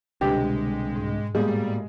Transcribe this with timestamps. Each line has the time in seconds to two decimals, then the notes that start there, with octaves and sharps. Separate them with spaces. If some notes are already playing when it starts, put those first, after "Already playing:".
0.21 C2 B2 D3 G#3 D4 G4 A6
0.96 G#2
1.35 A2 G3 G#3 A#3 B3 G4